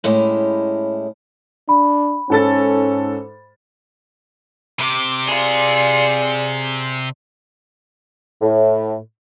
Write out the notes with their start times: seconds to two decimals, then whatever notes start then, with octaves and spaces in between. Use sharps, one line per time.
0.04 A2 G#3 C#4 E4 G4
1.69 D4 B5
2.30 G#2 C#4 A4 A6
4.79 C3 D6
5.28 F4 G#4 D5 C#7
8.42 A2